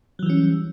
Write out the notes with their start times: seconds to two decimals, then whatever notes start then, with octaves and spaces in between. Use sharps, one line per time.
0.19 F#3
0.23 E3
0.26 G3
0.30 C#4